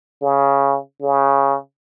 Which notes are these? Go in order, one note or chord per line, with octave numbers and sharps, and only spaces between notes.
C#3
C#3